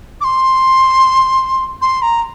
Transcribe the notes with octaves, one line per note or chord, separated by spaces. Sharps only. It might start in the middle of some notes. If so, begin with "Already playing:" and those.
D6
C6
C6
A#5